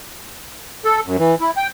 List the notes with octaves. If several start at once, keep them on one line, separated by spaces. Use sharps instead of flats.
A4
F#2
E3
E4
G5